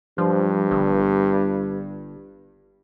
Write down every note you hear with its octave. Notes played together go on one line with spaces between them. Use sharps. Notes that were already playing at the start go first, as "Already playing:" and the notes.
G2 F3
G1